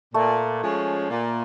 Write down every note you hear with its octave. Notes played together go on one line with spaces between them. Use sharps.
A#2 A3
F3 G#3 C#4
A#2